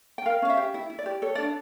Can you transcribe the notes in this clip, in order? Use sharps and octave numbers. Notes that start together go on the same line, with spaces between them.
G5
A#4 F5
C#4 F5
E5
G4
E4 E5
E4
D5
G4
A4 C#5
D4 D5